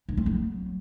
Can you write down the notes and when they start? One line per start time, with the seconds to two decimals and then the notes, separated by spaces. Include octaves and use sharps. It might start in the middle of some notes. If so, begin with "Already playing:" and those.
0.09 D#4
0.17 C4
0.26 F#3